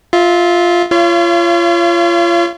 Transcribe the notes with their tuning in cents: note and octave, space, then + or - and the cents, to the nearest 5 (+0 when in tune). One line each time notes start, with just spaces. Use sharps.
F4 +0 E5 -25
F4 -30 C#5 +5 F5 -45